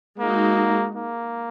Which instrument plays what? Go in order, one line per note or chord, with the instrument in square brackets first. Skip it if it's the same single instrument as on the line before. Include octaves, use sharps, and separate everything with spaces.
[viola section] G#3 D#4 F#4 [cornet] A#3
[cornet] A#3